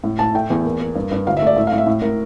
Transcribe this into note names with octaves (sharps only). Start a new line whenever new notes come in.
A2
A2 A5
A3 G5
E2
A#3
A#3
G2
G2
D2 F5
E5
A3 D5
A2 E5
F5
A2
E5
A2
A2 A#4